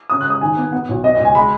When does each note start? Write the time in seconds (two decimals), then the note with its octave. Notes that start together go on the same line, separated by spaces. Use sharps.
0.10 C#3 D#6
0.21 F#6
0.26 G#3 D#6
0.41 D#3 G#5
0.57 B3
0.72 B3 F#5
0.89 B1
1.03 B3 D#5
1.15 C#2 D#5
1.25 G#5
1.35 G#3 B5